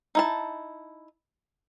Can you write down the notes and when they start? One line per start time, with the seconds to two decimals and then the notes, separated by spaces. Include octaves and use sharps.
0.15 D#4 E4 A5